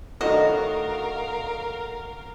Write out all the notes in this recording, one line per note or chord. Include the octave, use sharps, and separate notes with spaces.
A2 D#3 D4 F#4 A#4 D#5 F5